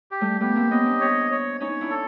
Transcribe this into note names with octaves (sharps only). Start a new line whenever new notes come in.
G4
G3 A3
A3 B3 G4
A#3 C4
B3 C#4 D#5
C4 D4
C#5
C#5
C#4 D#4 C#5
D4 E4
A4